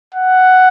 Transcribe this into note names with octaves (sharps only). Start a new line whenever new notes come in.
F#5